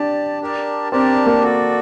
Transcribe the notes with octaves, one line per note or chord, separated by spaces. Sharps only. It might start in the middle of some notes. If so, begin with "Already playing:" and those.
Already playing: D4 G4 D5 A5
D4 G4 A#4 D5 A5
C4 D4 G4 A#4 D5 A5
A#3
F#4 A4 D5